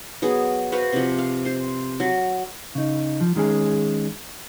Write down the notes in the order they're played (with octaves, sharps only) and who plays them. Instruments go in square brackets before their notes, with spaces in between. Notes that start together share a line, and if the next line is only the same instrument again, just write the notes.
[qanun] F#3 B3 G#4
F#4 B4 C5 F5
C3 F3
F5
C5 C6
F#3
[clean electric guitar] C#3 D#4
F3
D#3 G#3 C#4 G#4